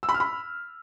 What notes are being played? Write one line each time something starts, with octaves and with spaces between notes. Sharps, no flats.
E6
B5
F6
B5